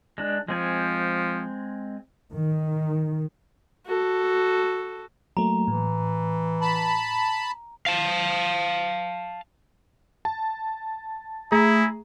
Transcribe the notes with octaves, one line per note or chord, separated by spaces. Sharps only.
G#3 D4
F3 G#3 C4 G#5
D#3
F#4 A4
F#3 A3 A#3 A#5
A2 E3
A5 B5
F5 A5
A5
A3 E4 G#4 A#5